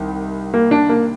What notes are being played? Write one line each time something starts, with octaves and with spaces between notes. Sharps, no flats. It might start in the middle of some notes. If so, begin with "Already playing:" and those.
Already playing: C2 D#3
A#3
D4
A#3